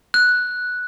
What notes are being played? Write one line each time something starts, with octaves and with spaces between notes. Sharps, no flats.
F#6